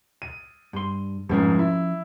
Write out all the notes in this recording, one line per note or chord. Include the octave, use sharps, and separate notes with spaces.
D#7
G2 C6
F1 G#2 F3 C#4 F4
E4